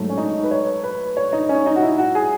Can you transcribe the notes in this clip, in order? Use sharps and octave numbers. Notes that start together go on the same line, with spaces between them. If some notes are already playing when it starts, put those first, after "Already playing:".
Already playing: G#2 F#3 A3
C#4
D#4
B4
C#5
B4
C#5
D#4
C#4
D#4
F#4
E4
F#4
G#4